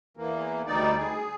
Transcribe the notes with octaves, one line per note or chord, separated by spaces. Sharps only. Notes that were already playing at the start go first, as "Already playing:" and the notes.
E2 E3 A#3
D2 G3 D#4 D5
G#4